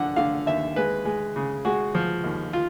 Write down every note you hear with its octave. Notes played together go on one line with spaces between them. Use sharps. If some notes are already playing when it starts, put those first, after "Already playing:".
Already playing: D3 F3 F#5
D3 F5
D#2 E5
G#3 B4
G#3
C#3
G#3 F#4
F3
D#2
F4